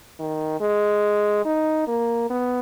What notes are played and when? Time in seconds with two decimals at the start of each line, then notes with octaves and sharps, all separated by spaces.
0.20 D#3
0.61 G#3
1.45 D#4
1.88 A#3
2.30 B3